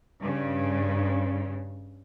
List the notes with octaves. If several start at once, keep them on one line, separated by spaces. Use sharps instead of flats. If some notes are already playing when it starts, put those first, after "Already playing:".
G2 C#3